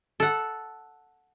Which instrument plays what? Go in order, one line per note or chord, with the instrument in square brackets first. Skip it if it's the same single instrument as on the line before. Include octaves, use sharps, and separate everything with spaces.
[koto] A4 F#5